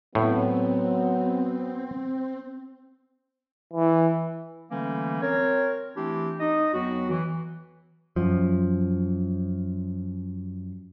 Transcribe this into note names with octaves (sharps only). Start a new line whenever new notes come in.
A2 F#3 B3 C4
E3
D3 E3 G3 A3 A#3 C#4
C4 A#4 C#5
E3 A3 C4 D4 E4 G4
D#4 D#5
F2 F#3 B3 F#4
E3
F#2 F3